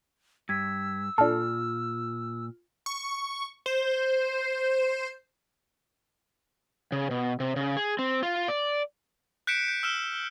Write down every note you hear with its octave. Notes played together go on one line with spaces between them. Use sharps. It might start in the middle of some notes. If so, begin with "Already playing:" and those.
G2 E6 G#6 B6
A#2 D4 F4 A4 F6
C#6
C5
C#3
B2
C3
C#3
G#4
C4
F4
D5
F#6 G6 B6 C#7 D7 E7
G6
E6 F6 E7 G7